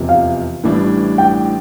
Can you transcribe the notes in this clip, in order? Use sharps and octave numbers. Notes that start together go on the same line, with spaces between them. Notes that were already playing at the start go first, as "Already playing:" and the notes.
Already playing: F1 E2 C3 F3
F5
A1 A2 E3 G3 D4
G5